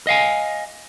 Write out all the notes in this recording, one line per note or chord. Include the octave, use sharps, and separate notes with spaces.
D#5 F5 G#5